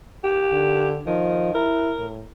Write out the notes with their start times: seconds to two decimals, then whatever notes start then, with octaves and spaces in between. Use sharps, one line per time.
0.24 G4
0.53 D3
1.07 D#3 F3
1.54 E4 A#4
1.99 A2